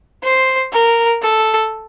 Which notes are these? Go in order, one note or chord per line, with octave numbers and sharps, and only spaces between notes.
C5
A#4
A4